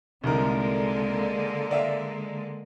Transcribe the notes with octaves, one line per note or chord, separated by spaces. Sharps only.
C2 D3 G#3 A#3 D#4 A#4
D5 E5 F5